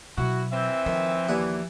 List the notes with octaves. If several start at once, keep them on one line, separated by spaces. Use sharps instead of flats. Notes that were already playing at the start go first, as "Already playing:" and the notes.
B2 F#3 E4 F#4
E3 C4 E5
D#3 F3
D#2 E3 D4 F#5